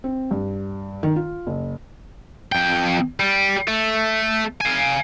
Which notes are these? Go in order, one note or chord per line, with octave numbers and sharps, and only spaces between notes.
C4
G2
D#3
F4
F#1
F2 G5
G3
A3
F5 G#5